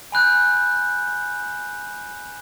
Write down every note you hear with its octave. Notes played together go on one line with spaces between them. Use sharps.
G#5 B5 F#6 G6